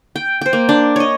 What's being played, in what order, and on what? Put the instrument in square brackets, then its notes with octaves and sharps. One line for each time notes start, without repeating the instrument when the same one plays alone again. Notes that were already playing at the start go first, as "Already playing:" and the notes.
[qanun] G5
C5 G5
A#3
D4
C#5 D#5